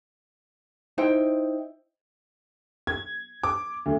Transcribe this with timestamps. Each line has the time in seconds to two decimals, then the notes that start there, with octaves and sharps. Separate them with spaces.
0.98 D#4 E4 C5 G5
2.87 G#6
3.43 D6
3.86 D2